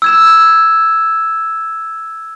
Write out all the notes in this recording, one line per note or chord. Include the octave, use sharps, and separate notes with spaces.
E6 G#6 E7